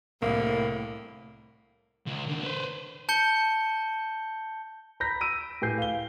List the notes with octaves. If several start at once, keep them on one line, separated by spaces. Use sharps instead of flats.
C2 A2 A#3
C#2
D#2 D3
B4 C5
A5 G6 C#7 G7
A#5 B5 G6 A#6 B6
E6 D7 D#7
A2 G4 B4 G#5 G6 C7
F5 G7